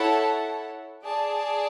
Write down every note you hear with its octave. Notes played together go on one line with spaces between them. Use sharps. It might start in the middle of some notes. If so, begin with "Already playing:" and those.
Already playing: E4 A4 C#5 F#5 A5
G#4 D5 A5